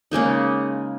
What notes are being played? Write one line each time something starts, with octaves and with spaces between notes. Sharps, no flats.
C#3 G#3 A#3 D#4